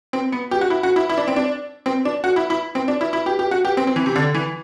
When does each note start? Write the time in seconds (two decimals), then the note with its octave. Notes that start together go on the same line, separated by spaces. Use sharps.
0.13 C4
0.32 B3
0.51 G4
0.61 F#4
0.70 E4
0.83 F#4
0.96 E4
1.09 E4
1.17 D4
1.28 C4
1.36 D4
1.86 C4
2.05 D4
2.24 F#4
2.36 E4
2.50 E4
2.75 C4
2.88 D4
3.01 E4
3.13 E4
3.26 G4
3.39 G4
3.51 F#4
3.65 G4
3.77 C4
3.87 C4
3.96 E3
4.06 C3
4.16 D3
4.34 E3